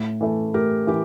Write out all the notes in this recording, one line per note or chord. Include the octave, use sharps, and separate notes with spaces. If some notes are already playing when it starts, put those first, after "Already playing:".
Already playing: A2
E3 A3
A2 G4 A#4
E3 G4